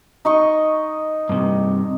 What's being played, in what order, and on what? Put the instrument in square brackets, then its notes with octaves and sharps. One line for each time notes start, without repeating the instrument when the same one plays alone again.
[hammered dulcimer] D#4 D#5 C#6
[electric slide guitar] G2 C3